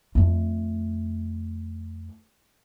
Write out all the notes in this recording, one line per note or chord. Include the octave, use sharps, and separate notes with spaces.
F2 A3